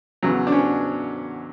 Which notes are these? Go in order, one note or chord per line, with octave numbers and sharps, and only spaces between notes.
E2 C#3 F#3
D4
C#4